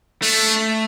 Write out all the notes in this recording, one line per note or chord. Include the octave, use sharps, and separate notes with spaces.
A3 D4